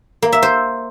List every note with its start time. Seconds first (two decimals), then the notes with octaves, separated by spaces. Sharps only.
0.22 A#3
0.32 E5
0.42 C5